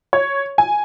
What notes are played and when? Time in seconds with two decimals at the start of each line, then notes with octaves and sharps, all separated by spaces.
0.13 C#5
0.58 G#5